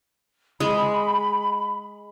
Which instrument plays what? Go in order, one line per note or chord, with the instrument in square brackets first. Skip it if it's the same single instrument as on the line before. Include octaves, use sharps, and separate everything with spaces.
[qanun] G#3 [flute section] B5